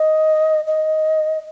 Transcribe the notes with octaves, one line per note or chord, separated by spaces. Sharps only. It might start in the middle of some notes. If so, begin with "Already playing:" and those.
Already playing: D#5
D#5